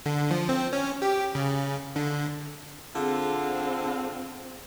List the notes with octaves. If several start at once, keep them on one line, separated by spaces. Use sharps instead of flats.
D3
F3
C4
C#4
G4
C#3
D3
D3 C4 F4 G#4